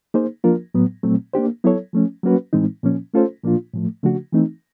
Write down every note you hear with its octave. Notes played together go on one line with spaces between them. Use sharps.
A#3 D#4 G#4 C5
F3 A#3 D4 F4 A#4
A2 F#3 B3
A#2 F#3 A3 C4
A#3 D4 G4 C5
F#3 B3 E4 A4 C#5
F3 A3 C#4
F#3 A#3 C#4 F#4 B4
A2 E3 G#3 C4 D#4
A#2 F3 A#3 C#4
A3 C#4 F4 A4 C5
A#2 F3 A#3 D4 F4
A2 F3 A3
C#3 F3 A3 D4 F#4
E3 A3 C4 D#4